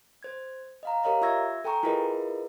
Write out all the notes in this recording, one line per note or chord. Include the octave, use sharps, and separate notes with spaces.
C5 G#6
D#5 F5 A#5
G4 A#4 C#5 D#5 F5 A#5
F4 E5 C#6 E6 G#6 A#6
A4 G5 G#5 A#5 C#6
E4 F4 G#4 A#4 B4 D#5